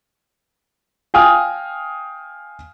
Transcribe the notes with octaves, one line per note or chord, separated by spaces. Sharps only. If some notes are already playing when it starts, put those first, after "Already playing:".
F5 G5 G#5 D#6 F6